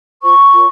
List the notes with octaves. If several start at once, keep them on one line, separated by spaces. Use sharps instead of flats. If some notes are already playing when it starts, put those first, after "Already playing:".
F4 C5 C#6
F4 A#4 C#5